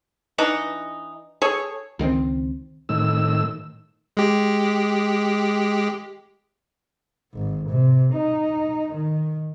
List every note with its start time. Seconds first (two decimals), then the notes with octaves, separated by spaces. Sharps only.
0.38 E3 D4 D#4 F#5
1.42 G#4 A4 C#5
1.99 C#2 D#3 G#3 C4
2.89 A2 D#3 E6
4.17 G#3 G4
7.33 G#1
7.69 C3
8.13 D#4
8.94 D#3